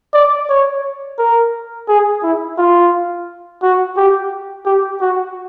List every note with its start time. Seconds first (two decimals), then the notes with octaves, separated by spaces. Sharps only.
0.14 D5
0.49 C#5
1.18 A#4
1.88 G#4
2.23 E4
2.58 F4
3.62 F#4
3.97 G4
4.66 G4
5.01 F#4